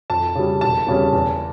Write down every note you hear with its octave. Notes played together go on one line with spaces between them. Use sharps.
F2 A5
C#3 G3
E1 A5
E2 C#3 G3 C#4
E2